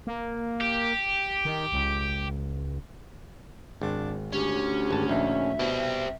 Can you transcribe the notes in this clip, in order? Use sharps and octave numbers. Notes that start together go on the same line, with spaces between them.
A#3
G4
D#3
C#2
G#1 D4
D2 C#4 G4
G#1 A5
A#1 D#4 E5
B2 G3 C4